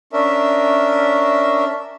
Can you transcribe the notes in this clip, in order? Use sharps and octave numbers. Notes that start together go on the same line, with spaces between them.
C#4 D4 A#4 E5